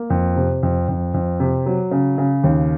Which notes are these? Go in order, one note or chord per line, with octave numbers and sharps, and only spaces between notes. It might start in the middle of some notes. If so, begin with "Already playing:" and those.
Already playing: A#3
F2
C3
F2
F2
F2
C3
F#3
C#3
C#3
D#2